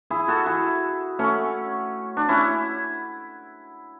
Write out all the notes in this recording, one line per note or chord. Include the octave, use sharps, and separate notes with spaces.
E4 G#4
F#4 A4
E4 G#4
A3 C#4
D4
C#4 E4